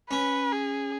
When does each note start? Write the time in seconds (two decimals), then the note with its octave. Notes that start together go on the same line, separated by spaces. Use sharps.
0.11 C#4 B4
0.52 G#4